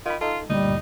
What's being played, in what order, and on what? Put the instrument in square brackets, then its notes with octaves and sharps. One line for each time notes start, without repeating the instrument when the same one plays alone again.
[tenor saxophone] D#3 [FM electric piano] F4 B5
[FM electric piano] D#4 A4 [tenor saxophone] F4
[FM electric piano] D2 G2 A#2 [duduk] G3 [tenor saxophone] D#4